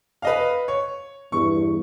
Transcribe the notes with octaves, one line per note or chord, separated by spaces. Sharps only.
B4 D#5 F5
C#5
E2 G2 C#6